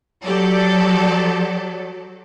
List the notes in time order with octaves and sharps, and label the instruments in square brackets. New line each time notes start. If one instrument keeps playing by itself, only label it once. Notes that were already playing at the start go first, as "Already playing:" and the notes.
[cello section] F#3 [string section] G4 A4 D5